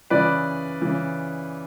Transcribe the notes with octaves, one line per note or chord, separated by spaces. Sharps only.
C#3 E3 B4 D5
C#3 E3